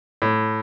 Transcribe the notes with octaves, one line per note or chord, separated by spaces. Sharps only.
A2